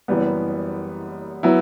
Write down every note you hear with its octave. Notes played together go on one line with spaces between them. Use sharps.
F#1 F#2 E3 G3 B3
F#3 B3 E4